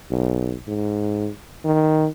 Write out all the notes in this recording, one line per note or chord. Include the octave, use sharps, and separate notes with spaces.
B1
G#2
D#3